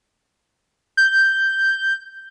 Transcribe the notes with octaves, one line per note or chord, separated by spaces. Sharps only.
G6